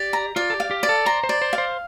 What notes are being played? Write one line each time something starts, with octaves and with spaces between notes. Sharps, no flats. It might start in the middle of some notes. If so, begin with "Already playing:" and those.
Already playing: G4 D5
A#5
F4 D5
A4
G4
F5
G4
D5
A4
C5 A#5
C5
D5
C5
F5
C5